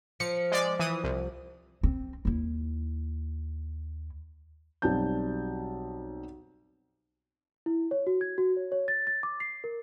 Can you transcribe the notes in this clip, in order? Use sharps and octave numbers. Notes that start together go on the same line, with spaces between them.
F3 C#7
G#3 D5
E3 D#6
C2
C4
D#2 E4
B1 G3 C4 A5 G6
E4
C#5
F#4
G#6
F#4
C#5
C#5
A6
A6
D6
C7
A#4